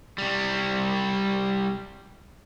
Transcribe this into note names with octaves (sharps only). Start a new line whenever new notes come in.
C3 G3